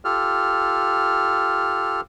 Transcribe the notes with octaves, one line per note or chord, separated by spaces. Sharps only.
F4 G4 A4 F6